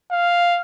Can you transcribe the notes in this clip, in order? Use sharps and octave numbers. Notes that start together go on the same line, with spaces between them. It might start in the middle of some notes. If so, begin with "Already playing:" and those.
F5